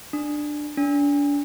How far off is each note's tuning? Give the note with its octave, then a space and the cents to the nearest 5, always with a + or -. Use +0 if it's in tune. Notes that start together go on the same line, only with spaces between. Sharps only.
D4 +10
D4 -30